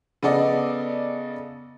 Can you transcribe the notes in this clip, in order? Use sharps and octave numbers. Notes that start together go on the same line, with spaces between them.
C#3 B3 A4 D5 D#5